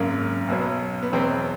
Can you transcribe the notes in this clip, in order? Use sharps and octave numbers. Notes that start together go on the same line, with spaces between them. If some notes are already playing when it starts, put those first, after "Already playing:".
Already playing: G#1 F#2 C#3 A#3
B1 B2 F#3
B3
E2 B2 F#3 C4